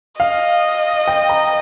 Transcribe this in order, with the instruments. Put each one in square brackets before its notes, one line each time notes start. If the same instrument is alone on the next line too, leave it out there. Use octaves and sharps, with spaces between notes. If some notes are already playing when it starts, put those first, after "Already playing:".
[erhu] D#5 [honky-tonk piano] F5
[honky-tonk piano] G5
A#5